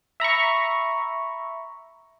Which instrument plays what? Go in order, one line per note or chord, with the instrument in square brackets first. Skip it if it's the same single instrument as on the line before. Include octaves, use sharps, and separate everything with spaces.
[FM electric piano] E5 A#5 B5 C#6